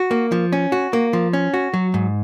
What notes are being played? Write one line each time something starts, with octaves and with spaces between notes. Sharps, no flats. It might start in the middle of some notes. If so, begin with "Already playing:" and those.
Already playing: F#4
A#3
F3
C#4
F#4
A#3
F3
C#4
F#4
F#3
G#2